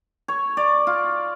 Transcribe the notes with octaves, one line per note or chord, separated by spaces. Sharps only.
C#5
D5
F4